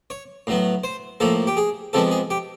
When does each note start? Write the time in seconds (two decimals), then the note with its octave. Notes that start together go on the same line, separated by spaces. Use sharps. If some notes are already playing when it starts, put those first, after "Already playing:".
0.10 C#5
0.47 A2 F#3 B3
0.84 C5
1.20 A2 F3 A#3 A4
1.47 G4
1.57 G#4
1.93 C3 F3 G#3 B3 A4
2.11 G#4
2.30 G4